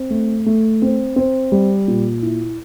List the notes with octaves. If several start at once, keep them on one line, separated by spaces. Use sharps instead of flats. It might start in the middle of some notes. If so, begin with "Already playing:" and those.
Already playing: C4
A3
A3
C4
C4
G3
A#2
E4